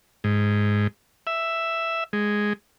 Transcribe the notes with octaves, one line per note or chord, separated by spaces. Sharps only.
G#2
E5
G#3